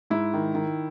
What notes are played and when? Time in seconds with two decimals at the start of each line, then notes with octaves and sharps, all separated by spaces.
0.10 G#2 E4
0.34 D#3
0.55 D#3